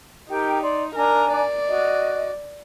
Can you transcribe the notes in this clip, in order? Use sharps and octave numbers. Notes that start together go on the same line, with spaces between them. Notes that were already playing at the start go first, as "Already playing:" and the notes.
D#4 G4 A#4 G5
D5 C6
D4 A#4 G#5 A#5
D5
F#4 D#5